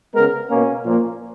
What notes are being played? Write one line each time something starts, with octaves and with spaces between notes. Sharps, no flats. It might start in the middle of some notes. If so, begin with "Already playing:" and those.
C#3 G#3 B3 A#4
B2 A#3 C#4
A#2 F3 A#3